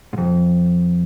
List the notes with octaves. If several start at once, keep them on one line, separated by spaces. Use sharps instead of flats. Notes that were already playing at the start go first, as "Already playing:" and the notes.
G#2
F2